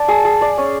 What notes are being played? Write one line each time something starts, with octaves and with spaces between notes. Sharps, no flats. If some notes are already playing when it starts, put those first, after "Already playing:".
Already playing: D5 A5
G#4
G#4
D5
C#4